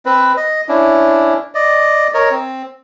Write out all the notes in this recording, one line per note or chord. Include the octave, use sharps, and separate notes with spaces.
C4 B4
D#5
C#4 D4 E4
D5 D#5
A#4 C#5 D#5
C4